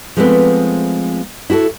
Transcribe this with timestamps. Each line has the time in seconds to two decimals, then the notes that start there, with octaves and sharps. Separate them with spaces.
0.17 F3 G#3 A3 B3 C4 B4
1.50 E4 F#4 G#4 A4